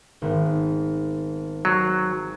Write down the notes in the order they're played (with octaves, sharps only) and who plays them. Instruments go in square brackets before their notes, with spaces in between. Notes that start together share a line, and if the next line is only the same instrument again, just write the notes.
[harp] G#1 B3
[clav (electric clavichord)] F#3 [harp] C7